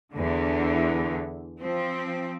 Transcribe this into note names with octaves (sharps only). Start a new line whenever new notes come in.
E2 D3
F3 C4